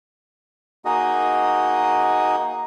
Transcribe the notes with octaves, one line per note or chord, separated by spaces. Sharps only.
A#3 D#4 F#4 G#4 D#5